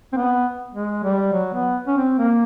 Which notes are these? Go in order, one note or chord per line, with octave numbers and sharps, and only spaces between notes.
C4
B3
G#3
G3
F#3
B3
C#4
C4
A#3